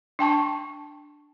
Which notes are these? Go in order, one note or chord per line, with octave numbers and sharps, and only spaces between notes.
D4 G5 A5 C#6